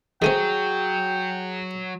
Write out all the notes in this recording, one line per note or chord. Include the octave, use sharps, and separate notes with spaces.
D#3 F#3 A3 C4 G#4 G5 D#7